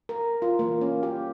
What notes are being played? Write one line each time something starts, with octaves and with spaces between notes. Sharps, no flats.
A#4
F4
E3 A#3
C#4
G4